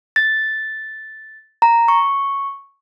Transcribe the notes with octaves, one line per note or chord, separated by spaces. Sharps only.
A6
A#5
C#6